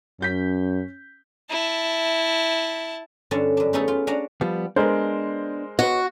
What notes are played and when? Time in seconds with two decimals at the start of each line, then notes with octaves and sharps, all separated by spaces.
0.21 F#2 C#4 G6 B6
1.50 E4 A5
3.31 G2 D3 C#4 F#4 A5
3.57 F#2 D4
3.73 A3 B3 C#4 D#4 G#4 A4
3.88 F4
4.07 C#4 D4 F#5 A#5
4.41 F3 G3 B3
4.76 G#3 B3 D4 A#4 C5
5.79 F#4 B4 C#5 D#5